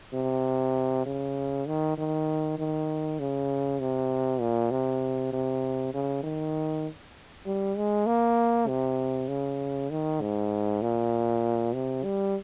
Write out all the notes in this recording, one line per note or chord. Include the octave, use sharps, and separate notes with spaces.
C3
C#3
D#3
D#3
D#3
C#3
C3
A#2
C3
C3
C#3
D#3
G3
G#3
A#3
C3
C#3
D#3
G#2
A#2
C3
G3